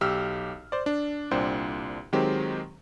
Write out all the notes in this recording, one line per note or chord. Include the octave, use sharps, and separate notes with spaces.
B1 G4 E6 F6
C5 D5
D4
C2 A#2 D4 C5 G5
D#3 F#3 G#3 C4 G4